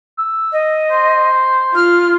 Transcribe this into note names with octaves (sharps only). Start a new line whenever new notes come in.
E6
D#5
C5
F4 F6